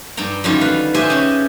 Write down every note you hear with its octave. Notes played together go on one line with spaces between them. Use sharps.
G2 G3 G5 A#5
F#2 D3 D#3 G3 F4
B4 F5
G4 B4 C5 D#5 E5 G#5
C#3 C#4